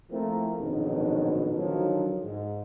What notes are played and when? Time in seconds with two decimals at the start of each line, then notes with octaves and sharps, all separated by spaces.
0.11 F3 A3 A#3 C4 E4 A#4
0.59 A#1 F2 G#2 B2 D#3 F#3
1.57 D3 D#3 F3 F#3
2.23 G#2